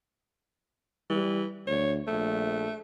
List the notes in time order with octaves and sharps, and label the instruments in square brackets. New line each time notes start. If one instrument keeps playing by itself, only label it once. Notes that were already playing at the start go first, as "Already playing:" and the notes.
[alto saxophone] E3 [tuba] G3
[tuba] D2 [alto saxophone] C#5
[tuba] A#1 [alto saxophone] A3